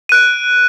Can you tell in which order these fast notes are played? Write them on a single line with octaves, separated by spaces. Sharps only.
D#7 F#6 D7